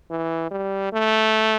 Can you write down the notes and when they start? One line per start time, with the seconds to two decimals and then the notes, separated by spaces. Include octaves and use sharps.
0.11 E3
0.51 G3
0.93 A3